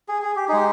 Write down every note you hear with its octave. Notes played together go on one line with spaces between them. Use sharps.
G#4
G#4
G4
G#3 D#4 G4 G#4